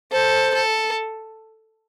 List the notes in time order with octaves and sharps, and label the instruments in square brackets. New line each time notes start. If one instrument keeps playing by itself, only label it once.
[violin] A4 [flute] C5
[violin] A4